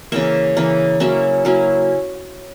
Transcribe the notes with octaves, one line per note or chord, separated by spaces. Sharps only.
C#3 E3 A#3 E5
C#3 E3 A#3
F#3 A#3 C#4 E4 E5
F#3 A#3 C#4 E4